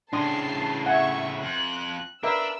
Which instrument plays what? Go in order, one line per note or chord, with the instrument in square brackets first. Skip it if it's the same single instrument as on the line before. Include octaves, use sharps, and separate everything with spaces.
[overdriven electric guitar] A2 C#3 [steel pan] D4 C6 D#6 [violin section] A5 C7
[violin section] E5 C#6 [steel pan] F#5 G#5
[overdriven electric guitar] F2 [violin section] F#6
[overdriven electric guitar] D4 [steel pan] A#4 B4 E5 [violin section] E6